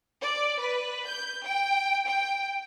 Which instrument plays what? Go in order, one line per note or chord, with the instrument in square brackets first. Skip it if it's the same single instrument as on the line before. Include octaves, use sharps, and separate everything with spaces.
[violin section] D5
B4
G6
G5
G5